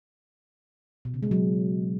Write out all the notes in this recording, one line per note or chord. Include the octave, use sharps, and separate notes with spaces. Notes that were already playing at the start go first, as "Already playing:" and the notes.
B2
C#3
G#3
F#3